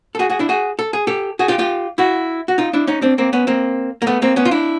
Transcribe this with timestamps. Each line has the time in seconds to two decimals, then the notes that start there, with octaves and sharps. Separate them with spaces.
0.15 A4
0.19 F#4 G#4
0.30 F#4 G#4
0.39 D4 E4
0.49 F#4 G#4
0.79 A4
0.93 G#4
1.07 G4 A4
1.39 F#4 G#4
1.48 F4 G4
1.59 F4 G4
1.98 E4 F#4
2.48 F#4
2.58 D#4 F4
2.73 D4 E4
2.87 C#4 D#4
3.02 C4 D4
3.18 A#3 C4
3.33 B3 C#4
3.47 A#3 C4
4.02 A#3
4.07 A3 B3
4.22 A#3 C4
4.36 B3 C#4
4.45 F4
4.51 D4 E4